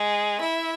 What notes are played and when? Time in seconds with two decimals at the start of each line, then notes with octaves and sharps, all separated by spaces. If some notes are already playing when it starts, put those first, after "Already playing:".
Already playing: G#3 G#4
0.41 E4 E5